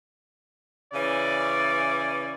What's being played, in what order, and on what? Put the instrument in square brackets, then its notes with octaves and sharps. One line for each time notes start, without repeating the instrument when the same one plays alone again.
[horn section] C#3 E3 C#4 D5